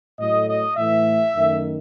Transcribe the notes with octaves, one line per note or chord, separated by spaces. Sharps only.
A2 F#3 A3 D#5
D#5
A2 E3 A3 E5
F#2 D#3 A3